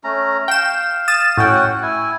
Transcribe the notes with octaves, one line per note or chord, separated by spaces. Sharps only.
A3 C#4 A#5
F5 G5 E7
D#6 A6 E7
A2 C#4 F#4 F#5 G5
E4 G#5